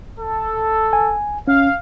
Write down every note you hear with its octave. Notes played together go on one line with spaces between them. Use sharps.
A4
G#5
C#4 F5